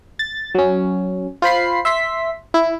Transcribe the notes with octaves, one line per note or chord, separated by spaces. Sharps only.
A6
F#3 C#4
F4 C5 B5 C7
E5 C6 B6
E4